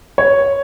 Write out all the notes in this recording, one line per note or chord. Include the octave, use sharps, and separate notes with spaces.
C#5